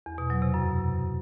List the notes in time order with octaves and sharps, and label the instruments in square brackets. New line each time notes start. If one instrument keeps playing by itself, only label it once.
[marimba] E2
B2
F#3
C3
F#2